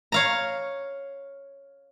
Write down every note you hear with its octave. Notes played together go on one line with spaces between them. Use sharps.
C#5 F5 A#5